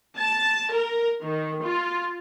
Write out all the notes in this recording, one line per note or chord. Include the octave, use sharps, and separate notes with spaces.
A5
A#4
D#3
F4